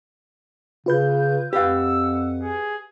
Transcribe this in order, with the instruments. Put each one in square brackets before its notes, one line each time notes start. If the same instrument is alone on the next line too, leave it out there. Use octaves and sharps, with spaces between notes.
[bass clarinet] C#3 [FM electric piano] F4 B4 G6
[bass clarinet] F2 [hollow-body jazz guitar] G4 F5 [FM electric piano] B4 F#5 [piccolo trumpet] E6
[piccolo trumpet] G#4